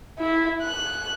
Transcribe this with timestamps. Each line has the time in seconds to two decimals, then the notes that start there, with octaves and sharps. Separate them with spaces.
0.18 E4
0.62 F#6